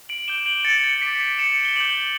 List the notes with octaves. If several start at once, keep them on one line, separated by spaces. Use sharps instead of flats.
D7 F#7
D6 G6 E7 G7
D7 F#7
A6 C#7
A6 C#7
D6 G6 B6 D7
D7
C#7 E7
G7
D6 G6 D7 F#7